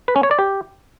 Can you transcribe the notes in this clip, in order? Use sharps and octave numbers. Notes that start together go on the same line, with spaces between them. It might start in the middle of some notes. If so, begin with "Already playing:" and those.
B4
C#4
C#5
D5
G4